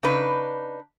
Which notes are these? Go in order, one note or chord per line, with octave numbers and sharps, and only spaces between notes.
C#3 D4 D#4 B4